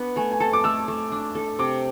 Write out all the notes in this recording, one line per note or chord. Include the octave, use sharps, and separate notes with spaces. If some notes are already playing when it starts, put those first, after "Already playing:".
Already playing: B3 D4
A3 G#5
G#5
A4 A5
D6
A3 E6
A3
D4
A4
C3 D6